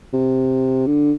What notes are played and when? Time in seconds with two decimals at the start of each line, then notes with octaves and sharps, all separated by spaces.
0.13 C3
0.87 D3